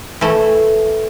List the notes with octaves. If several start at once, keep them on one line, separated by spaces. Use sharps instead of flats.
E3 A3